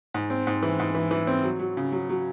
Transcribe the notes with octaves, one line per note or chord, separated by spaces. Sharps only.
G#2
C4
G#2
E3
G#2
E3
E3
C4
F#3
F#3
C#3
F#3
F#3